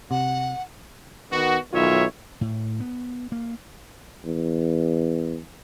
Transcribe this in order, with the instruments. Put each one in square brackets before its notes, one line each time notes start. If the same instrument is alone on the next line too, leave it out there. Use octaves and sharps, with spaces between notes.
[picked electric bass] C3 [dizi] F#5
[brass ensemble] D#3 B3 F#4
B1 D#3 E4 F4 C#5 E5
[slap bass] A2
B3
A#3
[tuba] E2